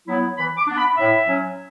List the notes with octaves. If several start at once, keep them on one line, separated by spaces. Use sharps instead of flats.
F#3 B3 E4
E3 B5
D6
B3 D4
B5
A2 E5
F#3 C#4